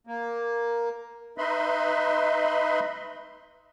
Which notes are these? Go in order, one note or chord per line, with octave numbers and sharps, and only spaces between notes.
A#3
D#4 B4 D#5 E5 B5 C6